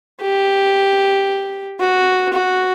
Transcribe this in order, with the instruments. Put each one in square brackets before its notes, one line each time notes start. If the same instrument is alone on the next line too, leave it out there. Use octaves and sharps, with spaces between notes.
[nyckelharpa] G4
F#4
F#4